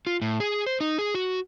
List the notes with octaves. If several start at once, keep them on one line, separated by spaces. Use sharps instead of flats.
F4
A2
G#4
C5
D#4
G#4
F#4